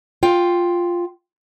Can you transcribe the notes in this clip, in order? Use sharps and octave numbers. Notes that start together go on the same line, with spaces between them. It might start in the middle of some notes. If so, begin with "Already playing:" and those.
F4 G5